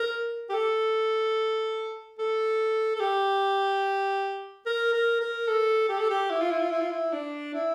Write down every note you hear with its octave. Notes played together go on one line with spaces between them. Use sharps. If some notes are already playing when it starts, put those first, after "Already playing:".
Already playing: A#4
G4
A4
A4
A4
G4
A#4
A#4
A#4
A4
G4
A4
G4
E4
F4
E4
F4
E4
F4
E4
D4
E4